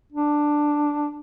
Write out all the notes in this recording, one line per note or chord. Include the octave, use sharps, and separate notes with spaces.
D4